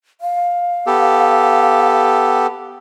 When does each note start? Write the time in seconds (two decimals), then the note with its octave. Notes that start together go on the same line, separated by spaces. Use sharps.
0.21 F5
0.87 B3 G4 A4